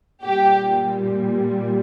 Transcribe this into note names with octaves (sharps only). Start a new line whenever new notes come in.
A#2 G3 G4